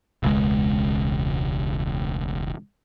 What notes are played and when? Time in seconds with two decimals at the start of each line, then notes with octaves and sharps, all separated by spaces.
0.23 E1 C#2 G#3